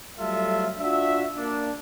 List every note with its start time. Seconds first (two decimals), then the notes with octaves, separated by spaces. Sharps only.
0.19 F#3 G3 A3 F4 A4 E5
0.79 D4 F4 F#4 E5
1.36 A#3 D4